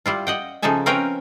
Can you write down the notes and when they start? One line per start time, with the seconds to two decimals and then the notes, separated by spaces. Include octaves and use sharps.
0.06 G3 E4 F4
0.27 D#5 F#5 G5
0.62 C#3 F3 D#4 A4 E5 G#5
0.86 C4 C#4 A#4 B4 C#5 G5